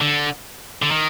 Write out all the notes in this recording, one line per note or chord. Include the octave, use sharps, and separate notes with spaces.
D3
D3
D#3